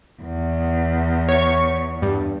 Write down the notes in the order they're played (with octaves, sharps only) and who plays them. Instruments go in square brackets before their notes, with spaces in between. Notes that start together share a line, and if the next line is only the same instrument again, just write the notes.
[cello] E2
[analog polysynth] C#5 C#6
G2